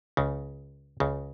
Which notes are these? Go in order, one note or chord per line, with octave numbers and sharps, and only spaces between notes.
C#2 C#3
C#2 C#3